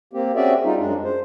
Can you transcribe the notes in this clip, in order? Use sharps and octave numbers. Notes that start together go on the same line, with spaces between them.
A#3 C4 G4
C4 C#4 F#4 G#4 D5 E5
G3 D#4 F4
F#2 G#3 D4
C5